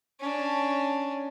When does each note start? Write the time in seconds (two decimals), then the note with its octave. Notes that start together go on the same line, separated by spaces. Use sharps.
0.20 C#4 D4